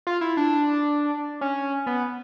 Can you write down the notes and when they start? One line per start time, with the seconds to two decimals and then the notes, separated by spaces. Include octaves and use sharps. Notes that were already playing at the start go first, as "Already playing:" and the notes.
0.07 F4
0.21 E4
0.37 D4
1.41 C#4
1.86 B3